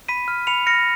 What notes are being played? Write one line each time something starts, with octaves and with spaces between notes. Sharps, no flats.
B5 B6 D#7
F6
B5 C#7 F7
F6 A#6 C#7